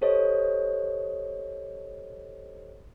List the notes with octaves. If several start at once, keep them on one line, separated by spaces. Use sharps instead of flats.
G4 A4 C5 C#5 D#5